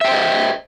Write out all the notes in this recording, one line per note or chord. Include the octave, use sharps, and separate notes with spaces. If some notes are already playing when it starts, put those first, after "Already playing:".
C5 D#5 E5 G5